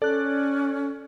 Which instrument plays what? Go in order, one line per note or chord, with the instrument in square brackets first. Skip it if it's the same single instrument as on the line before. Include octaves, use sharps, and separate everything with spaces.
[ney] C#4 [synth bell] A4 F#6 [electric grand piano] D5